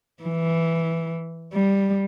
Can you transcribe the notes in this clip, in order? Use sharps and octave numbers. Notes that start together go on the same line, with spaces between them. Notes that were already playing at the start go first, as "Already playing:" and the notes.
E3
G3